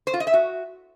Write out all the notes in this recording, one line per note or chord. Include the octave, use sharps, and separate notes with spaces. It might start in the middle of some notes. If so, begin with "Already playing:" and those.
C5
F4
D#5
E5
F#4